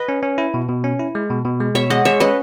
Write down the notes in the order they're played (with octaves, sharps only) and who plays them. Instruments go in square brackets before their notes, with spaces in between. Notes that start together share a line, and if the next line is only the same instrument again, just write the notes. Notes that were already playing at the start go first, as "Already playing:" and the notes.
Already playing: [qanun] B4 D#5
[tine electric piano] C#4
C#4
E4
B2
B2
C#4
E4
G#3
B2
B2
G#3
[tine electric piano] B2 [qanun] C#5 E5
[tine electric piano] G#3 [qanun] D#5 F#5
[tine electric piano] G#3 [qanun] C#5 E5
[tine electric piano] C#4 [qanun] B4 D#5